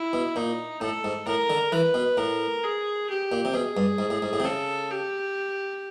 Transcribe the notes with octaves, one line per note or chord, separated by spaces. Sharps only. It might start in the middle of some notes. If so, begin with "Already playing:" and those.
Already playing: E4
B2
A#2 D#4
A2 A4
G#2
A2 A#4
D3
E3 B4
B2
A2 A#4
G#4
G4
A#2
C3
B2 G#4
G2
G#2
A2
G#2
A2
C3
C#3 A4
G4